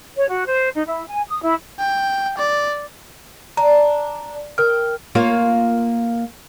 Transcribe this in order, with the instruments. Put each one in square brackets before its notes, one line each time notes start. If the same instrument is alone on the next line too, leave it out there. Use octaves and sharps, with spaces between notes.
[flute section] C#5
F#4
C5
D#4
E4
G#5
D#6
E4
[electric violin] G5
D5
[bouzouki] D4 [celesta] A#5
[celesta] A#4 F6 [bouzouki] G5
[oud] A#3 F4 C#5